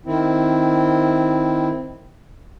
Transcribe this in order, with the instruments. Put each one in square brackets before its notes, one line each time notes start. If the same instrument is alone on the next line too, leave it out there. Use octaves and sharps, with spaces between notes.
[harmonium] D#3 C4 E4